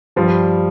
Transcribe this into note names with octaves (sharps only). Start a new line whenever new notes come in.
G2 F3 G3